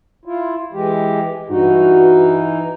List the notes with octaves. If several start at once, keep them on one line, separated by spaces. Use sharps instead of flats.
E4 F4
E3 G#3 G4
G2 E3 D#4 F#4